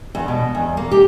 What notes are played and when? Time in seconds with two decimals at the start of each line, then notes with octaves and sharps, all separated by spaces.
0.15 E2
0.28 B2
0.55 E2
0.77 A#3
0.91 G4